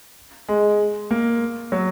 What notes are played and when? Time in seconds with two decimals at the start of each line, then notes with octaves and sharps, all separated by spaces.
0.49 G#3
1.11 A#3
1.72 F#3